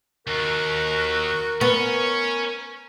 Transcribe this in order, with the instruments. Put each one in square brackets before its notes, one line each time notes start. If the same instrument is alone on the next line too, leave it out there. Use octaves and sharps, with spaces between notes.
[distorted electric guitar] D#2 [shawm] F#4 [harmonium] A#4
[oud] B3 [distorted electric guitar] C#4 [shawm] C#6